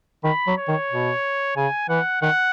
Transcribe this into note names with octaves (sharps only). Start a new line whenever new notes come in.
D#3 B5
F#3
C#5
D#3
B2
C#3 G#5
E3 F#5
D#3 F#5